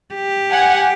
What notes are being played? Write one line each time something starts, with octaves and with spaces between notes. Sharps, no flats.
G4
F#5 G#5